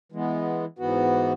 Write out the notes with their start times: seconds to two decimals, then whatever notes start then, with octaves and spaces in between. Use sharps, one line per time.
0.12 E3 G#3 B3
0.79 G#2 E3 B3 F#4